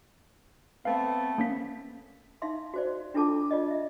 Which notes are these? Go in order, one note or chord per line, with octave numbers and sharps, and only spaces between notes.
A3 B3 C4 F5
A#3 C#4 B6
D#4 E4 E5 F5 C6
F#4 C5 D5
D4 E4 F4 A4 A5 D6
F4 D5 D#5
D#5 E5